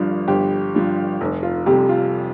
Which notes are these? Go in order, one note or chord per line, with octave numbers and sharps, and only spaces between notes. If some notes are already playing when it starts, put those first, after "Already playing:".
Already playing: G1 G2 F3
G1 G4
G2 F3
F1
F4
F2 C3 G3 G4
F4